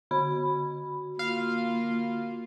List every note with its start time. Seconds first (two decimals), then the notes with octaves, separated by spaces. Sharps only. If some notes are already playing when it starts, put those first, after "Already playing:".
0.11 D3 F#4 B5
1.19 A#3 F4 F5